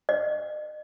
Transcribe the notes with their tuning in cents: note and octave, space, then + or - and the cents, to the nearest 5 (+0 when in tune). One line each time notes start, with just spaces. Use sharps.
D#5 -40